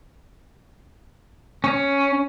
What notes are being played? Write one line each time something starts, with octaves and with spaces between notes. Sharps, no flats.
C#4